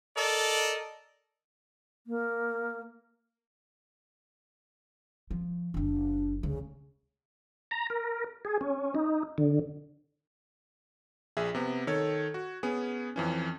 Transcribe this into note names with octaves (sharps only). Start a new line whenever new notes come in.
A4 A#4 D5 D#5
A#3
F3
F#1 D3 D4
D2 C#3
A#5
A#4
G#4
C#4
D#4
D3
A#1 G#4 E5
C3 B3
D#3 A4 C#5 G#6
F#4
B3 C#4 G#4
F2 E3 C#4